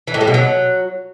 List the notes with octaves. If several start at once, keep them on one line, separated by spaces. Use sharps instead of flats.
E3
A2
G3
B2
F#3